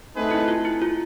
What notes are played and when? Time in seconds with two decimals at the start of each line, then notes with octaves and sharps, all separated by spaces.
0.14 A3 C4 D#4 G#4 B4
0.31 E4
0.48 F4
0.65 E4
0.82 F4